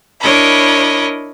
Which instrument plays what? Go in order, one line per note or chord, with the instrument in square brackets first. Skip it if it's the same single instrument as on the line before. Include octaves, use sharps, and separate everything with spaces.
[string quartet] D4 E4 A#4 C#5 D#5 B5